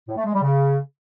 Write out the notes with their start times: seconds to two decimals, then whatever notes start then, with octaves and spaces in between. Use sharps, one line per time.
0.08 A2
0.17 A3
0.26 G#3
0.34 G3
0.43 C#3